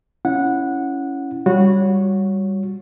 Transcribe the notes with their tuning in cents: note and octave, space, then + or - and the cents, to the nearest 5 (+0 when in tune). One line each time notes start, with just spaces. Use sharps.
C#4 +0 E4 +0 F#5 -15
G3 +0 F#4 -20 C#5 +0